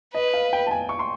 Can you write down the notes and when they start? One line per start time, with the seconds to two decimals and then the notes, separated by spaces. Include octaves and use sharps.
0.15 B4 D#5
0.34 F5
0.53 G5
0.67 A5
0.71 G#5
0.89 C#6
0.99 C6